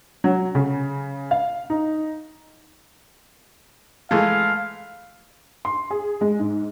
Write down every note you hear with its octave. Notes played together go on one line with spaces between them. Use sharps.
F#3
C#3
F5
D#4
E3 G#3 A3 F5
C6
G#4
G#3
G#2